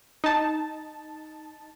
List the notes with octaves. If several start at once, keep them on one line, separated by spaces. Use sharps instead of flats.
D#4 A5